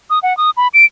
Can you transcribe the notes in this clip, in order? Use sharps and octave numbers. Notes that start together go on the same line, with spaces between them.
D#6
F#5
D#6
B5
D7